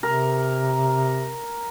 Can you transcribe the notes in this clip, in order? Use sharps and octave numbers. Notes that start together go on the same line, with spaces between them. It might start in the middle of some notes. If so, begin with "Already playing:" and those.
C3 A#4